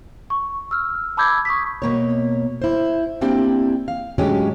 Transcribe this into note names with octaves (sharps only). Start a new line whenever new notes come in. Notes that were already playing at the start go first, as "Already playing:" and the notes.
C#6
E6 F6
A5 B5 D6 E6 G6 G#6
C#6 D#6 B6
B2 A#3 C#5
E4 C5
A#3 C4 D4 E4 G4
F5
A2 D3 F#3 G#3 C#4 G4